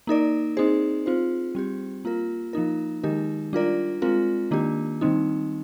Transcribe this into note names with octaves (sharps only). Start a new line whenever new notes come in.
A#3 D#4 A#4 D5
C4 D#4 G#4 C5
C4 F4 C5
G3 C4 G4
A#3 F4 A#4
F3 A#3 D#4 A#4
D#3 G#3 D#4 G4 A#4
G3 D4 F4 A#4 D5
G#3 C4 F4 A#4
D#3 A#3 D4 G4
D#3 G3 C4 D#4